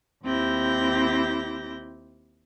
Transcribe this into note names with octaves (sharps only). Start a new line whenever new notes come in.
D#2 C4 E4 G4 G6 A#6